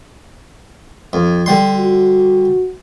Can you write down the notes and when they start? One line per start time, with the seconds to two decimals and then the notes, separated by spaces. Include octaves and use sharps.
1.13 F2
1.46 D3 G3 C6
1.77 F#4